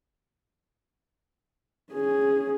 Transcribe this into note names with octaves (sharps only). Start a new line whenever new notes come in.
C#4 G#4